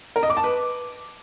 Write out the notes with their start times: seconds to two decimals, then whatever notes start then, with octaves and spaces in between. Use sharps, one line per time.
0.16 A#4
0.23 D#5
0.30 D6
0.37 A5
0.44 B4